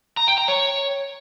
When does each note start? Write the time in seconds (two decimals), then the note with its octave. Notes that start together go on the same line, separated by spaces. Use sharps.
0.17 A#5
0.28 G5
0.38 A#5
0.48 C#5